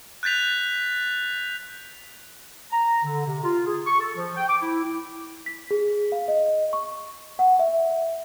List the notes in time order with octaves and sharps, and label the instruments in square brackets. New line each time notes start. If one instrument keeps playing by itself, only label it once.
[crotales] F#6 G6 A6 B6 F7
[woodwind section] A#5
D3
C3
F4
G#4
C#6
A4
F3
G5
D6
E4
[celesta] B6
G#4
F5
D#5
C#6
F#5
E5